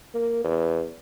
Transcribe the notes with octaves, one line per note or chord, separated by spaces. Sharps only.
A#3
E2